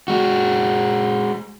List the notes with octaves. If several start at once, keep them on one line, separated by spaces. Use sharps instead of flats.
G#3 F#4